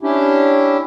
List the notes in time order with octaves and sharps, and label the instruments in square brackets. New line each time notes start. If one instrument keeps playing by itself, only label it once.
[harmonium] C#4 D4 E4 G4